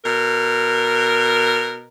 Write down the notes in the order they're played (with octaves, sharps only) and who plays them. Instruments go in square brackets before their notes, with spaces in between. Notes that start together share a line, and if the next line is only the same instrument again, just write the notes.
[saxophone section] B2 A#4